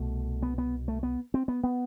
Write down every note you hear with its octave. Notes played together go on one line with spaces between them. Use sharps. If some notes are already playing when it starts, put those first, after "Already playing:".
Already playing: C2 B2 A3
B3
B3
A3
B3
C4
B3
B3